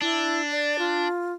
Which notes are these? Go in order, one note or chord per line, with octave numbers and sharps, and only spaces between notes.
D4 E4
D5
F4